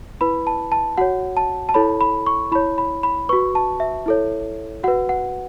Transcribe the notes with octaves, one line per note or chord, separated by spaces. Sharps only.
E4 B4 B5
A5
A5
F#4 C#5 F#5
A5
A5
E4 A4 C#5 B5
B5
C#6
E4 C#5 B5
B5
B5
F#4 B4 C#6
A5
E5
E4 A4 C#5
F#4 B4 F#5
F#5